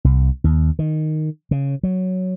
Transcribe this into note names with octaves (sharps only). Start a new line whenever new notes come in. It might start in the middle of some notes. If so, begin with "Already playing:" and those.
C2
D#2
D#3
C#3
F#3